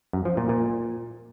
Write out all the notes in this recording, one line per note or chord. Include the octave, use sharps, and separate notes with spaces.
F#2
F3
A#2
A#2